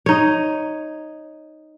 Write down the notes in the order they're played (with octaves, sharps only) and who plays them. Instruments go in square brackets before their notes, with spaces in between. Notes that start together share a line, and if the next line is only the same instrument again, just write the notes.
[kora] D#4 C#5